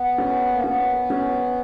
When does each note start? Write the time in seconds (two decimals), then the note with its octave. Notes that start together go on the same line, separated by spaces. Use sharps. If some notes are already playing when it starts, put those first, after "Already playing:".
Already playing: B3
0.18 C#4
0.53 A#3
0.64 B3 C#4
1.10 C#4